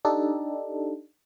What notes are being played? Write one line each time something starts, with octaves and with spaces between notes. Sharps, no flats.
D4 D#4 G4 A4